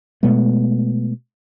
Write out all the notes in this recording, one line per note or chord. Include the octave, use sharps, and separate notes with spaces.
B2 G#3 A3 B3